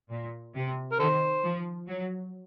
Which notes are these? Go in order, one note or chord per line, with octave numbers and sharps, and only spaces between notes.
A#2
C3
A#4
D#3 A4 C5
F3
F#3